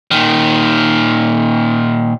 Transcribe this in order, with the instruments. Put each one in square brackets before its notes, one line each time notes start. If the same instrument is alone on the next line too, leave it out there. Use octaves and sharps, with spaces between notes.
[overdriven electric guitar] A#2 D#3